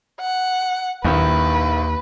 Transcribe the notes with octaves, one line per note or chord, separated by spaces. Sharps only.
F#5
A#1 D#2 D#3 E4 B4